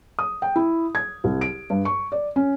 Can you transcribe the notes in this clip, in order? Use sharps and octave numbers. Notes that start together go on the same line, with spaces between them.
D#6
G5
E4
G#6
C2
D7
G2
C#6
D5
C#4